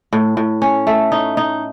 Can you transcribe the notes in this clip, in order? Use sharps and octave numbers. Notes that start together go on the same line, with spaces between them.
A2
A2
C#4
A3
D#4
D#4